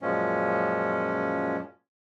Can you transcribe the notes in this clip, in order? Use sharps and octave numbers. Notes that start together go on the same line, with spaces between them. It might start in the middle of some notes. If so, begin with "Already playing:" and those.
F#2 A#2 F3 G#3 C#4